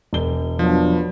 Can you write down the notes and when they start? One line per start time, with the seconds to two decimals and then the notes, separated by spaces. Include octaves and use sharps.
0.13 E1 G7
0.59 F3 F#3 B3 D4